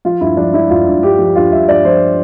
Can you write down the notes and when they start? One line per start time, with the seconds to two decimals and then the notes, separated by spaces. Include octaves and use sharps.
0.05 F3 F4
0.21 G2 E4
0.37 F3 D4
0.54 F3 E4
0.70 G2 F4
0.87 G2
1.02 G2 G4
1.18 F3
1.35 G2 F4
1.52 G2 E5
1.68 G2 D5
1.85 F3 C5